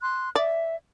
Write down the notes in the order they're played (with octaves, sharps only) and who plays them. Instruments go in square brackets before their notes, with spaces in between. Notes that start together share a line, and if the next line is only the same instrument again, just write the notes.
[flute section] C6 F#6
[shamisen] D5 [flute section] E5